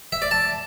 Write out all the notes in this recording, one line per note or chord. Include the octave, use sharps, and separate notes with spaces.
E5
D5
A5